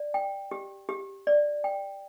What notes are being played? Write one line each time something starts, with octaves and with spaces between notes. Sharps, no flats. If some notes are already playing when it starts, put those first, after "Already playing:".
Already playing: D5
G5
G4
G4
D5
G5